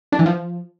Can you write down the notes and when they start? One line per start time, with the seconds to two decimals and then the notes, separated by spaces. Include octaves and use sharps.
0.12 D4
0.19 E3
0.26 F3